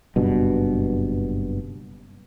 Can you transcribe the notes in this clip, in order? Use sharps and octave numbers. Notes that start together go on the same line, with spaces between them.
F#1 G2 B2